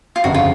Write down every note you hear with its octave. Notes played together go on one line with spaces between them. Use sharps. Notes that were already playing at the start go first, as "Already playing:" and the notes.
F4
G1 F2 C#3 F#4
F4